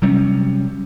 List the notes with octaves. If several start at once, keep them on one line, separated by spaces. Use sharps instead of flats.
C3 F#3 G3 C#4